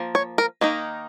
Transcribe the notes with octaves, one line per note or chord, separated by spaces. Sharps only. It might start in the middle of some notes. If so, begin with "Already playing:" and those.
Already playing: F3 A#3
C#5
A#4
D#3 A#3 D#4